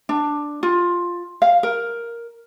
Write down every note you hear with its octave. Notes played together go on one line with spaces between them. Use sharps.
D4
F4
F5
A#4